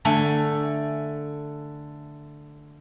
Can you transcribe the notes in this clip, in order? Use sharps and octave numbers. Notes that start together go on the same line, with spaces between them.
D3 A3 A4 G#5